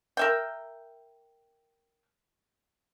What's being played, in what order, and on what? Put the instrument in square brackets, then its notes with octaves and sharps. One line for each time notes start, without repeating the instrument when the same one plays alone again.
[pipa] A#4 E5 G5